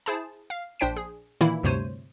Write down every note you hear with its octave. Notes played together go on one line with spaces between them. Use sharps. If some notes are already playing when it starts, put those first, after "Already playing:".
E4 G#4 C5 A5
F5
A#1 D4 C5 G5 B6 D7
G#4
A#2 D#3 E3 A#3 E4
D2 G2 C3 C5 C#5 D#7